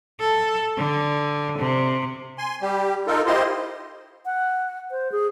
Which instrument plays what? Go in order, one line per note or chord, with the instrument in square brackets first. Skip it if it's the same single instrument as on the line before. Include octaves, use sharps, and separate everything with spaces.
[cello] A4
D3
C3
[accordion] G#5 C6
G3 G4
D#4 F4 A4 A#4
E4 F4 G4 C5 D#5 C6
[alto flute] F#5
C5
G#4